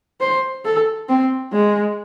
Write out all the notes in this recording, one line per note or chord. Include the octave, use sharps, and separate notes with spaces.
C5
A4
C4
G#3